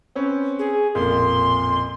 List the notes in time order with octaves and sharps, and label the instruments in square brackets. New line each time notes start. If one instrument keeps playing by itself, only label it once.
[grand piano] C4 C#4 B4
[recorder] G#4
[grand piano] A1 F2 A#2 [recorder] C6